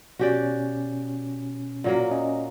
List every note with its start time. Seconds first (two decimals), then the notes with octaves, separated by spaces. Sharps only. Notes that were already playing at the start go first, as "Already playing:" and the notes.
0.19 B2 C#4 F#4 G4 D5
1.84 A#2 F#3 A#3
2.11 C#4 D#5